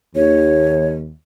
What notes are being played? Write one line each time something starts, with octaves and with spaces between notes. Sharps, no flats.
D#2 C#5